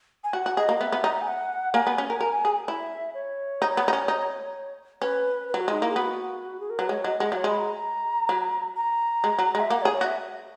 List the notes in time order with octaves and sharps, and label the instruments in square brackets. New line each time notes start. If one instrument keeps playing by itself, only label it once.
[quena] G#5
[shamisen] F#4 [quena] F#5
[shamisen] F#4
[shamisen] G#4 [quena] D#5
[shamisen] A#3
[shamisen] B3 [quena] E5
[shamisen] B3
D#4
[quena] G#5
F#5
[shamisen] A#3 [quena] G#5
[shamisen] B3
C#4
A#4
A#4
G#4
[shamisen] E4 [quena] E5
[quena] C#5
[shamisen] D#4
B3
D#4
C#4
D#4
[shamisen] C#4 [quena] B4
[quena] B4
[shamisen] F#3
[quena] F#4
[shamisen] G#3 [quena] D#4
[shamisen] A#3 [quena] E4
[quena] G#4
[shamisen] B3 [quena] F#4
[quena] G#4
A#4
[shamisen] F#3 [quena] B4
[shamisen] G#3 [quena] C#5
[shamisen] F#3 [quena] D#5
[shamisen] G#3 [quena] F#5
[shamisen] F#3 [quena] C#5
[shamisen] G#3 [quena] B5
[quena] A#5
[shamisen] F#3
[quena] A#5
[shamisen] G#3
F#3
G#3
[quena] E5
[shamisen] A#3 [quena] F#5
[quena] C#5
[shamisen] G#4
[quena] C#5
[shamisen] F#4
[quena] E5